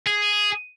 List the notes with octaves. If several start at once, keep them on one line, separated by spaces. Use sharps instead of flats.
G#4